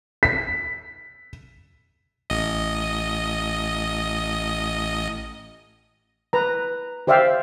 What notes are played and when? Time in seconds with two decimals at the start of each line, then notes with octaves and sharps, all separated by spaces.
0.23 B6
2.30 A1 D#5
6.33 B4 A#5
7.07 G4 C5 D5 E5 F5 G5